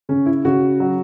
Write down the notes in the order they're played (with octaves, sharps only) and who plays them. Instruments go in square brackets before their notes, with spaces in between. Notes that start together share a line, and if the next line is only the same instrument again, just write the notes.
[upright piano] C#3 [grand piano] C#4
[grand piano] E4
[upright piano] C#3 [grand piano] F#4
[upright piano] F#3